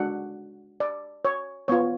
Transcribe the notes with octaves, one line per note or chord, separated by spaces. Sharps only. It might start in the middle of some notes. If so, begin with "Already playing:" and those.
Already playing: G#3 D4 F#4 F#5
D5
C#5
B3 F4 C#5